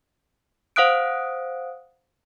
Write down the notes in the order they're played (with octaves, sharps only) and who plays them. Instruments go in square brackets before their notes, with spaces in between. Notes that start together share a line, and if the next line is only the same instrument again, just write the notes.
[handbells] C5 F5 F#5 D#6 F#6 D7